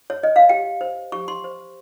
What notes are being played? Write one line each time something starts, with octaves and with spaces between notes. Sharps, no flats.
C#5
D#5
F5
G4 G5
C5
G4 C#6
C6
C5